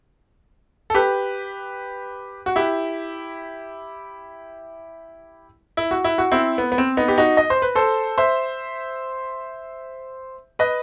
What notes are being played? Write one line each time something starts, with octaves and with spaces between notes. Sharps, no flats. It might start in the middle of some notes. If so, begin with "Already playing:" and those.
A4
G4 B4
F#4
E4 G4
E4
F#4
E4
F#4
C4 E4
B3
B3
C4
B3 D#4
G4
D#4 F#4
D#5
C5
B4
A4 C5
C5 E5
B4 D#5